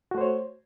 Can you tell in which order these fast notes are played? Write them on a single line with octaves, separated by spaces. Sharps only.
F#4 A3 C5 C#5